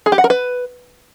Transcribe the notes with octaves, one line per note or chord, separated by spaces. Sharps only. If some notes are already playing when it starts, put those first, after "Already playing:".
G#4
G4
F#5
A#4
B4